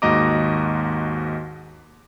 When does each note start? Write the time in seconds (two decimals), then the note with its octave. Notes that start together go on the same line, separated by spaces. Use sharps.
0.02 D#2 G#2 F#4 D#5 A#5 D6